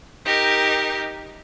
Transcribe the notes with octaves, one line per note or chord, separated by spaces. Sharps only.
D#4 G4 A#4